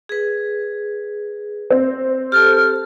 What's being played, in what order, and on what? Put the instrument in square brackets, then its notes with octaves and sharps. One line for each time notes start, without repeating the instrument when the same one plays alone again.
[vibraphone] G#4 B4
[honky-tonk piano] C4
[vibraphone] G4 A4 A5 [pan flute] F6